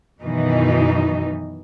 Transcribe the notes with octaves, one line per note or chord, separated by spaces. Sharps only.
F#2 B2 D#3 E3 D#4